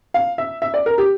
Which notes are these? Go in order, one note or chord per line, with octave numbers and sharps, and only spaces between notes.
F5
E5
E5
D5
A#4
G4